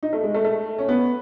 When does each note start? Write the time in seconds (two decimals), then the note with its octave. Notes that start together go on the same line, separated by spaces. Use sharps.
0.03 D#4
0.13 A3
0.23 G#3
0.35 A3
0.45 A3
0.78 C#4
0.89 B3